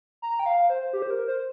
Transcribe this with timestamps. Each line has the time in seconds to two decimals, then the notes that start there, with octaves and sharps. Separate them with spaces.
0.22 A#5
0.40 G5
0.46 F5
0.70 C5
0.93 G4
1.02 C5
1.10 A#4
1.28 C5